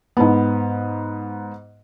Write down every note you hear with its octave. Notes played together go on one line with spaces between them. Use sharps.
G#2 B3